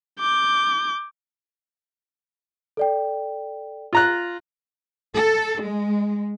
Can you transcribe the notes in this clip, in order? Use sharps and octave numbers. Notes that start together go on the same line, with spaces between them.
D6 G6
A4 D5 G5
F4 A#5 F#6
A4
G#3